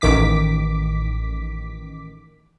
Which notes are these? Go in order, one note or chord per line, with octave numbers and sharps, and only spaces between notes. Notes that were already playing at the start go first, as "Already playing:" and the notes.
A1 D#3 D6 B6